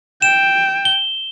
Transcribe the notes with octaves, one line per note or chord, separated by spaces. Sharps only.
G5 E7
G7